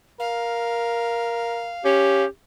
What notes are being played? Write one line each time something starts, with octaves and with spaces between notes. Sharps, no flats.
A#4 F5
C#4 G4